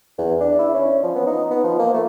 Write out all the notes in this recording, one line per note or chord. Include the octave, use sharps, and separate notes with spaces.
E2
D4
E4
C#4
F3
B3
D#4
B3
F3
A#3
A3